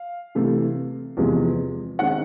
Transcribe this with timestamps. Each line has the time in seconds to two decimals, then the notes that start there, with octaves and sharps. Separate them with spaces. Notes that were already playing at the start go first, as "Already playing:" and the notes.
Already playing: F5
0.35 C3 E3 A3
1.17 E2 C3 F3 G#3
1.99 D#3 G#3 C4 D#4 F#5